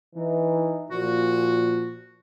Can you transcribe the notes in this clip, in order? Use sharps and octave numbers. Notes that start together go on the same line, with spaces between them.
E3 D#4
A#2 F3 F#4